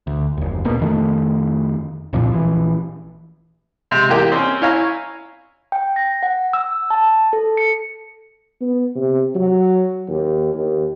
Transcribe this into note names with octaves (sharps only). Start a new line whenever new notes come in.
D2
F#1 D#2
D#1 A#1 B2 A#3
F2 D#3 A3
C2 F2 A#2 F3
A#1 E3
C3 G#3
E2 A#3 G4
C4 C#4
E4 C#5 F5 G#5 A#5
G5
A#6
F#5
E6
A5
A4
C#7
B3
C3
F#3
D#2
D#2